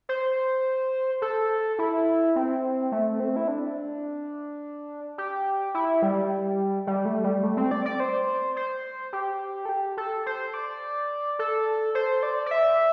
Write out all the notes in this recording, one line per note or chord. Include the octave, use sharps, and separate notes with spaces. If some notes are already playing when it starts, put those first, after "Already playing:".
C5
A4
E4
C4
A3
C4
E4
D4
G4
E4
G3
G3
A3
G3
A3
C4
D5
D5
C5
C5
G4
A4
G4
A4
C5
D5
A4
C5
D5
D5
E5